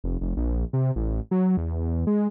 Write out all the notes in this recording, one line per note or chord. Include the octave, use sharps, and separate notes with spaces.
F1
F1
A#1
C3
A1
F#3
E2
G#3